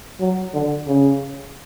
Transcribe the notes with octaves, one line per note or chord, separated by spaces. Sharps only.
F#3
D3
C#3